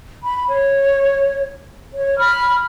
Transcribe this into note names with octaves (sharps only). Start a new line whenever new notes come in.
B5
C#5
C#5
B5 F6